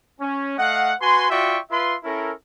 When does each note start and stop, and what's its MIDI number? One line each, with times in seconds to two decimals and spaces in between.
0.21 0.56 61
0.58 0.93 57
0.58 0.93 75
0.58 0.93 77
0.58 0.93 78
1.01 1.28 66
1.01 1.28 71
1.01 1.28 80
1.01 1.28 84
1.30 1.59 65
1.30 1.59 66
1.30 1.59 74
1.30 1.59 76
1.30 1.59 79
1.30 1.59 85
1.71 1.96 65
1.71 1.96 71
1.71 1.96 76
1.71 1.96 84
2.04 2.32 61
2.04 2.32 64
2.04 2.32 69
2.04 2.32 70